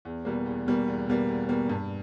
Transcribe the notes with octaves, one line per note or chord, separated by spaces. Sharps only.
E2
B2 G3 A#3
E2
B2 G3 A#3
E2
B2 G3 A#3
E2
B2 G3 A#3
G2